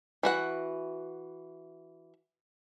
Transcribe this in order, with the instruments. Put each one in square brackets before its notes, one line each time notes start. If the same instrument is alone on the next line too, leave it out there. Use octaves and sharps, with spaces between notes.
[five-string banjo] E3 F#4 F#5